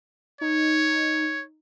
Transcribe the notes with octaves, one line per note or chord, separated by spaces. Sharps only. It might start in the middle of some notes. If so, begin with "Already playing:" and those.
D#4 C#5